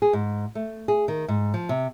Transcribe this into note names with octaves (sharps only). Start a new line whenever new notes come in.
G#4
G#2
A3
G#4
D#3
G#2
F3
C3